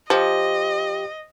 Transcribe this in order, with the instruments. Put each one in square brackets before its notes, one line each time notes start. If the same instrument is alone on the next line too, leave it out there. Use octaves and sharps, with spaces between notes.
[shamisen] F3 [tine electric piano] G4 [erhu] D#5